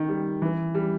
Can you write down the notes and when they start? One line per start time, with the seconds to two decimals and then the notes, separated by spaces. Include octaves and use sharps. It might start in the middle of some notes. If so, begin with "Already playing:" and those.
Already playing: D#3
0.09 G3
0.42 E3
0.75 G3